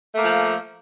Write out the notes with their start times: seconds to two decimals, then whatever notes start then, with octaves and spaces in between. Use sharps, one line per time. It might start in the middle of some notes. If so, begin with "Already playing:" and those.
0.14 A3
0.18 A#3
0.22 F3